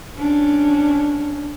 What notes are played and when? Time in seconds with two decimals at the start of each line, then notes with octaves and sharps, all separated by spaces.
0.18 C#4 D4